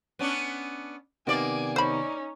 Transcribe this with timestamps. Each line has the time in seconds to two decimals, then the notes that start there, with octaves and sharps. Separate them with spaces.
0.19 B3 C#4 D4
1.27 C3 D#3 A#3 B3 D5 G#5
1.76 C#4 D#4 C5 B5